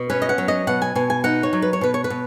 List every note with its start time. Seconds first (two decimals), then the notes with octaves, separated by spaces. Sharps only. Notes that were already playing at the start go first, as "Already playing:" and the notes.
Already playing: B2
0.10 C#4 B4
0.22 D#5
0.29 F#5
0.38 F#3
0.48 D#5
0.67 B2 F#5
0.82 G#5
0.95 B2 G#5
1.10 G#5
1.24 D#4 F#5
1.43 C#5
1.53 F#3
1.62 B4
1.73 C#5
1.81 B2 B4
1.94 C#5
2.04 B4
2.10 B2